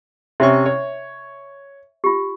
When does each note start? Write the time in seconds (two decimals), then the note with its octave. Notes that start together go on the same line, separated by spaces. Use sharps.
0.40 C3 C#4 E5 C#6
0.66 C#5
2.04 F4 G4